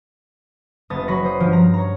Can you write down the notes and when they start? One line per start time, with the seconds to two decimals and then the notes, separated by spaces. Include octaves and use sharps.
0.90 F#1 B3 A5 D#6 A6
1.08 F#3 F#4 A#5 B5 A#6
1.24 C5 D#6
1.40 G2 F3
1.53 A#5
1.74 C#5 A#5